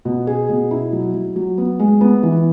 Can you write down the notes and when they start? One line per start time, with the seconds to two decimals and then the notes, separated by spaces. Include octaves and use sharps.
0.05 B2
0.27 G#4
0.49 B2
0.71 E4
0.92 F#3
1.14 F#3
1.36 F#3
1.58 B3
1.79 G#3
2.01 B3
2.23 E3